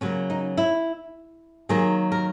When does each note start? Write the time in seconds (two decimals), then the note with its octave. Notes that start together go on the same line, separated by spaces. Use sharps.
0.01 C#3 F#3 A#3 C#4
0.30 D#4
0.57 E4
1.69 D#3 F#3 A#3 G#4
2.12 A#4